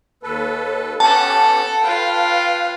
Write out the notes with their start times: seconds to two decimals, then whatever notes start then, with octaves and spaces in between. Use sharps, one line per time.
0.23 D#2 A4 B4
1.00 B3 C#4 G4 A4 F#5 A5
1.83 F4 B4 F5 G5